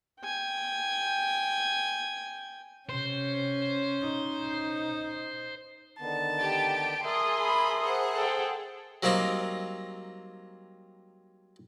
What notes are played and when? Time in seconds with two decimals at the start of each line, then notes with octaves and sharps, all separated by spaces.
0.21 G5 G#5
2.89 C3 C#4 C5
4.01 D#4
6.00 D3 D#3 B3 A5
6.40 G4 G5 D7
7.04 G#4 A#4 E5 A5 C6 D#6
7.44 B5
7.82 G#4 C5 F#5
8.14 A4 G5
9.03 F#3 G3 A#3 C4 D#4